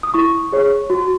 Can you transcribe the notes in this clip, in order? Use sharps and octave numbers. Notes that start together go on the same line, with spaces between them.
D#6
E4 C#6
G#4 C#5
F#4